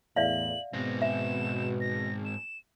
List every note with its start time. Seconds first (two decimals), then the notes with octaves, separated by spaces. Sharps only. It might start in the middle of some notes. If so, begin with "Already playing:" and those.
0.16 E2 A2 D5 E5 F5 F#7
0.73 G#2 B2 C4 A#6
1.02 E5 E7
1.81 A#6
2.25 E7